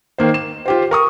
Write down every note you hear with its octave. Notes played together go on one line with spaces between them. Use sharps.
D#3 A#3 C5
E7
F4 G4 C5
A#4 C#6 D#6